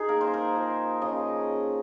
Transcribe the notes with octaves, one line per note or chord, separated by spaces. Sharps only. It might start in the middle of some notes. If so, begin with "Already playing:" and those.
Already playing: D#4 G#4
A#3 A#4
C5
A#4
F3
C#3 D#5